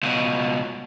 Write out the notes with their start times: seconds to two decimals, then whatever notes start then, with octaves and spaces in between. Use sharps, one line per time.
0.03 C#2 B2